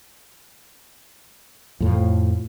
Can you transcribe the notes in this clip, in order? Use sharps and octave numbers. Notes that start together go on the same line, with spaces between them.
F2 A2 F3